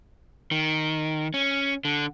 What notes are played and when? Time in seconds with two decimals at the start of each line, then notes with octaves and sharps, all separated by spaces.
0.51 D#3
1.34 C#4
1.85 D3